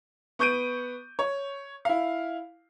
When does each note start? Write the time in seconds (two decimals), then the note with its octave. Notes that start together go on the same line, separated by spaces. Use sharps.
0.39 B3 C#6 G6 D7 D#7
1.19 C#5
1.85 E4 F5